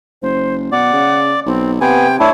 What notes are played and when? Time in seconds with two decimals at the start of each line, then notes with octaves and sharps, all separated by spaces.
0.22 F#1 C5
0.72 B2 D5 F#5
0.93 C#3
1.46 B1 C4
1.81 C3 B3 G5 G#5
2.20 A2 D4 E4 C#5